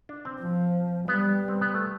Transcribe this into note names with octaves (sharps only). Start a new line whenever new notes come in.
D4
C4
F3
G3 B3
C4
B3
A3